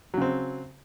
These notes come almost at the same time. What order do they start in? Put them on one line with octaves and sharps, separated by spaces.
F#3 C#3 C4